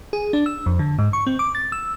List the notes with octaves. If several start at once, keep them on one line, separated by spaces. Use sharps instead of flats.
G#4
D4
E6
F2
D3
G#2
C#6
C4
D6
A6
E6